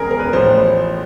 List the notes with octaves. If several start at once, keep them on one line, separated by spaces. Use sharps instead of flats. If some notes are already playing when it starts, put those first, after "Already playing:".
Already playing: E1 E2 C#3 F3 G#4 A#4
A#4
B4
A1 A2 F3 C5